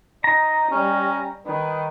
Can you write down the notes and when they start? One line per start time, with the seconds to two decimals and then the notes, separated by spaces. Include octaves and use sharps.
0.24 D#4 A#5
0.71 G3 C#4
1.46 D#3 B4